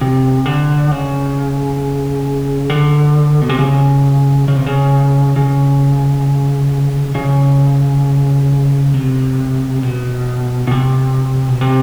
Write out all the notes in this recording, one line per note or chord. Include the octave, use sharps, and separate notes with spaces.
C3
D3
C#3
D3
B2
C3
C#3
C#3
C3
C#3
C#3
C#3
C3
B2
B2
C3
B2
C3